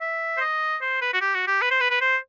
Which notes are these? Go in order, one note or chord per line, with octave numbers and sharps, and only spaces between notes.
E5
C5
D#5
C5
B4
F#4
G4
F#4
G4
B4
C5
B4
B4
C5